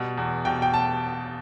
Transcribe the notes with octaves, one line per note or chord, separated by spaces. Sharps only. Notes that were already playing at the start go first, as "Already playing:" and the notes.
Already playing: B2 G3
E2
B2 G5
G5
A5